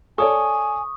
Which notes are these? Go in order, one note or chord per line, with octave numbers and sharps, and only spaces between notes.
A4 C#5 D5 G#5 C#6 D#6